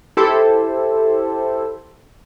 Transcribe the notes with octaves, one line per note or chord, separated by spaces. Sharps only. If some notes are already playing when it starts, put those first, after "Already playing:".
E4 G4 A4 C5